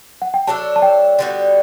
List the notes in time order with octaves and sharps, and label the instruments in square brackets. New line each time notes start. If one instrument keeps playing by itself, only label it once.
[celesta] F#5
G5
[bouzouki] F#3 A3 D4 A4 [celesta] A5
[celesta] A5
G5
[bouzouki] D3 G3 B3 F#4